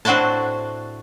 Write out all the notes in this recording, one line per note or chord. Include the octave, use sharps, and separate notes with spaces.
A2 C4 D4 F#4 C5 A5